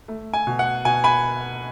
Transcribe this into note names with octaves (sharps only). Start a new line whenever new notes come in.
A3
G#5
B2
F#5
B2 G#5
G#5 B5